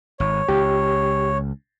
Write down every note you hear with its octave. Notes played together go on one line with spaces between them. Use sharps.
G#1 C#5
C#2 G4